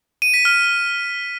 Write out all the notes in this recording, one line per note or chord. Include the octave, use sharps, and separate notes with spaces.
D#7
B6
F6